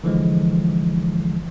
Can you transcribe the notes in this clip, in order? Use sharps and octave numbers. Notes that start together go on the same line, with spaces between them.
D3 E3 F3 G#3